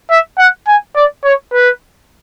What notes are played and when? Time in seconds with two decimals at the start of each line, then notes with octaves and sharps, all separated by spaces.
0.11 E5
0.39 F#5
0.68 G#5
0.96 D5
1.24 C#5
1.53 B4